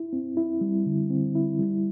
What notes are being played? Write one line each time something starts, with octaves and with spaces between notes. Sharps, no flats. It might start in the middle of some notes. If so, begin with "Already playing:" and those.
Already playing: E4
C4
E4
G3
D3
C4
E4
G3